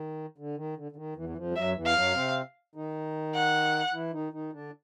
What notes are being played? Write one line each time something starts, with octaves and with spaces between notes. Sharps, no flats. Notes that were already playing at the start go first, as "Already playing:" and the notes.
Already playing: D#3
D3
D#3
D3
D3
D#3
E2 E3
E3
F2 F3
G3
F#2 F#3 E5
E2 E3
F5
F#2 F#3
C3 C4
D#3 D#4
F#5
E3 E4
D#3 D#4
D#3 D#4
D3 D4